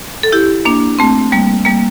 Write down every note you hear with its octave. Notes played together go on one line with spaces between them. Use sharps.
A4
E4 G4
A#3 D4
A3 C4
G3 A#3
G3 A#3